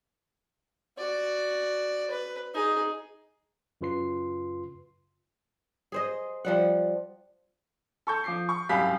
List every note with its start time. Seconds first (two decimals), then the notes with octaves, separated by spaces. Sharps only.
0.98 F#4 D5
2.11 B4
2.54 D#4 G#4
3.81 F#2 C#3 F4 B4 C6 C7
5.92 G#4 C5 D#5
6.45 F3 G3 F#5
8.07 A4 C#6 G6
8.24 F3 D6 C7
8.49 C#6
8.69 C2 F#2 G4 F5 B5 B6